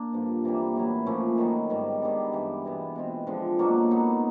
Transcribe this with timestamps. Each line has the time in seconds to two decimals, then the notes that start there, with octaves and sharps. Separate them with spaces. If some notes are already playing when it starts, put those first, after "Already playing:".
Already playing: A#3 D4
0.13 G2 D3 F3
0.44 C3 E3 G3 A#3
0.76 A2 F#3 B3 E4
1.06 A#2 F3 A3 C#4
1.38 D#3 F#3 B3 D#4
1.70 G#2 D#3 G3
2.02 D#3 G3 B3 D4
2.32 G2 E3 G3
2.65 B2 G#3 B3
2.96 B2 G#3 C4
3.27 D3 F3 G#3
3.59 B2 F#3 A#3 D4
3.91 F#3 B3 D#4